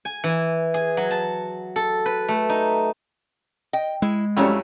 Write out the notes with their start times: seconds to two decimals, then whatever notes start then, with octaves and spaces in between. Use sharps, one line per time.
0.05 G#5
0.24 E3
0.74 G#4
0.97 F#3
1.11 A5
1.76 A4
2.06 B4
2.28 A3
2.49 D#4
3.73 D#5 G5
4.02 G#3 E4
4.37 F2 F#3 G3 A3 C#4 E4